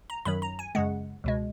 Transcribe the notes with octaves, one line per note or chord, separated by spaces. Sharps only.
A#5
F#2 D#3 F#3 B5
A#5
G#5
F#2 C#3 G#3 F#5
C#2 B2 G#3